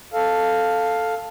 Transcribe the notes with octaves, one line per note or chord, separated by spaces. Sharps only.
A4 F5